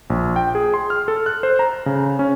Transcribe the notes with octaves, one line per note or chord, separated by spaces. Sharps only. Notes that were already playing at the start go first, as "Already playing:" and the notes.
A#1
G5
G#4
C6
F6
A4
F#6
C5
A#5
C#3
C#4